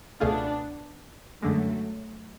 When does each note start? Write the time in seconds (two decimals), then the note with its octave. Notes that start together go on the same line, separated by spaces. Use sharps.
0.20 C#2 B2 A3 B3 D4 F4 G#4
1.42 F#2 D3 F#3 G#3 A3